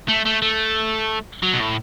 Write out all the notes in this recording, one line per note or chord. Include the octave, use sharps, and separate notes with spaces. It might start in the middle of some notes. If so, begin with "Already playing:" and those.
A3
A3
A3
F#3
B2
A2